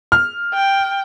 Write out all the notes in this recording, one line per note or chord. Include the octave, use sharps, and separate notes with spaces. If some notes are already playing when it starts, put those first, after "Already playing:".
F6
G5